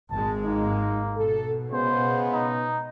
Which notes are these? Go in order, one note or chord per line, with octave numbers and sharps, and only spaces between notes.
G#1 G#3 A5
A#3 D#4
B2 A4
C#3 G#3 B3 C5
D#4